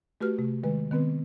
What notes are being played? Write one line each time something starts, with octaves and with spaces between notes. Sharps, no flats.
A3 F#4 G4 B4 F6
C3 A3
D#3 G#3 B4
D#3 B3 C4 B4